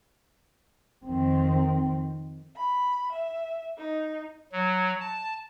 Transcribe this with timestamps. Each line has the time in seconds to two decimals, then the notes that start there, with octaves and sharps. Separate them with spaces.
1.03 F2 D#3 C4
2.56 B5
3.12 E5
3.77 D#4
4.52 F#3
5.00 A5